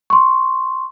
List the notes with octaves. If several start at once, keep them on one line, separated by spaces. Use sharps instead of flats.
C6 C#6